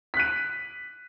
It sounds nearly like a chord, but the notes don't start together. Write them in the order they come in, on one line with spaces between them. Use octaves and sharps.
B6 F#6 D#7